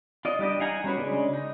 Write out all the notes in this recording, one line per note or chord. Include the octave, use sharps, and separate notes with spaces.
F4 D5 D#5
G3 D4 G4 D#5
D#4 F5 F#5 G#5 A#5
G3 C#4 F#4 B4
C#3 G#3 A3 D4
D#4